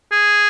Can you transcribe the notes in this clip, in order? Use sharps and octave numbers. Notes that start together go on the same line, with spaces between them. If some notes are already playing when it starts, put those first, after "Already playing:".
G#4